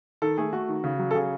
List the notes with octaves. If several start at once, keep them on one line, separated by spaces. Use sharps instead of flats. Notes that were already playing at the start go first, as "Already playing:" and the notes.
D#3 A4
A3 G#4
A3 F#4
D#3
C#3
F#3
A4
C#3 G#4